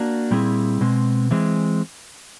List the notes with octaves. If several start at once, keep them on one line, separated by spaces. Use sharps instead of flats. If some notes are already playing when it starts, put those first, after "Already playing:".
Already playing: A#3 D4 F#4
A#2 G3 C4 E4 G#4
B2 G#3 C4
E3 G#3 C4